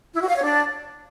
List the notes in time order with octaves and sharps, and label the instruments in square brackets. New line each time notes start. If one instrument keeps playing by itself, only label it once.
[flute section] E4
F#4
F5
C#5
D4